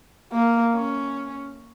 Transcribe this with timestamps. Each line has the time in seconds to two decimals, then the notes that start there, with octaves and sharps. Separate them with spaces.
0.33 A#3
0.74 C#4